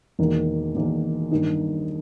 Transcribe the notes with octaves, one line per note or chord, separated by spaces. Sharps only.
E1 E2 D#3 A#3
E1 E2 D#3 A#3
G1 G2 D#3 A#3 D#4